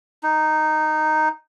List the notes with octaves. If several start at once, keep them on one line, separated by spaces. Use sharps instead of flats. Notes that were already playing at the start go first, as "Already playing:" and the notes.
D#4